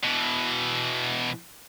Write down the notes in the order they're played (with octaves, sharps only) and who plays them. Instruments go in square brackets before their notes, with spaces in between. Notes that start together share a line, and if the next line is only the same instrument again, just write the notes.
[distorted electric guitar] B2 E3